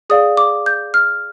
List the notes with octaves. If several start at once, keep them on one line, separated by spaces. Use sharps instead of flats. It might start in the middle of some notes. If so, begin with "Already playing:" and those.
G#4 D5 F5 D#6
D6
G6
F6